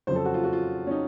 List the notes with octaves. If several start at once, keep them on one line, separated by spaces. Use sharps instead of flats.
F2 C#3 F#3 C5
A4
F#4
F4
F#4
F4
C#4
D#4